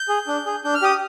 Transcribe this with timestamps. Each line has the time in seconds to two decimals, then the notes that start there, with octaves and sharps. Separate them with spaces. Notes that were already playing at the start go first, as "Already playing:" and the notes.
Already playing: G6
0.09 G#4
0.27 D4
0.46 G#4
0.64 D4 G6
0.75 F6
0.82 G4 D#6